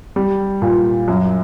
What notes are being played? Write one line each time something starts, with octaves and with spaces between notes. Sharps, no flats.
G3
A#2
F#2